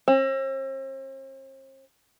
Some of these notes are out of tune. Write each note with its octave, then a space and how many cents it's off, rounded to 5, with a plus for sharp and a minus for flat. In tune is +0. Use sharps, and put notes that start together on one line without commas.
C4 +45